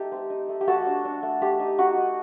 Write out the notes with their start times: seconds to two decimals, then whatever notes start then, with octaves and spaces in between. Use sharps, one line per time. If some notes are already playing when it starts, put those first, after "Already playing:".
Already playing: A3 D#4 G4
0.12 C4
0.30 D#4
0.49 A3
0.61 G4
0.67 A3 F#4 A4
0.86 D4
1.05 D4
1.23 A3
1.42 A3 G4
1.59 D#4
1.79 D#4 F#4
1.97 D#4